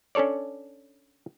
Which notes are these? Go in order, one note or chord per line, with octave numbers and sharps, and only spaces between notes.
C#4 D4 A4 C#5 D5